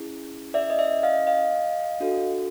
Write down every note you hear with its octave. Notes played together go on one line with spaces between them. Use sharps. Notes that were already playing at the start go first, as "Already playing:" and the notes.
Already playing: C#4 E4 G#4
D5 E5
D#5
D5 E5
D#5 F5
D#5 F5
D4 F#4 A4